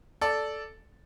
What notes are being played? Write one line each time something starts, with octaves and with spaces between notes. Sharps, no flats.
A4 D5